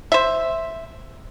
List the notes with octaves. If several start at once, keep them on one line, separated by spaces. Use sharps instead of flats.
C5 E5